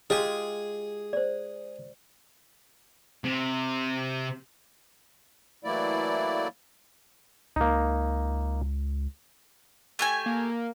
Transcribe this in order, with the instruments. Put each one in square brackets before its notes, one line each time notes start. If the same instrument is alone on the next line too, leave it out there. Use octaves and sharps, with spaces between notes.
[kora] G#3 F4 G4 [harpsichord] G#4
[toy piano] C5 D5
[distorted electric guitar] C3
[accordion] E3 F#3 A3 A#3 E4 D5
[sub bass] C#2 [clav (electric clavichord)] A#3 D#4
[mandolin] A3 G4 G#5
[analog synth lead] A#3